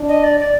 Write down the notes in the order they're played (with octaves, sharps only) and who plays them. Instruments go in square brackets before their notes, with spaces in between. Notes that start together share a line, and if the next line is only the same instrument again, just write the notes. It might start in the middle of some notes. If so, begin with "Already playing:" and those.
Already playing: [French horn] D4
[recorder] D#5
D5
D5